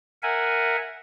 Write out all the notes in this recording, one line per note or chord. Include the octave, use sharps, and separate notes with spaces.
A#4 E5 F#5 G#5